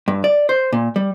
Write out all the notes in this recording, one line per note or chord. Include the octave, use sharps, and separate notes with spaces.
G2
D5
C5
A#2
G3